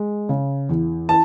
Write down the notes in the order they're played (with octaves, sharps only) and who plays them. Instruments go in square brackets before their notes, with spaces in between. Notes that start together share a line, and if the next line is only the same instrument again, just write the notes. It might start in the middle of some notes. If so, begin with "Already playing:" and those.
Already playing: [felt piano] G#3
C#3
E2
[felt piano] E3 [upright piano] A5